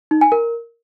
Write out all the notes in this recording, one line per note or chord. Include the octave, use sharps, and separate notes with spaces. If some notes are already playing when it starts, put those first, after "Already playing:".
D#4
G#5
A#4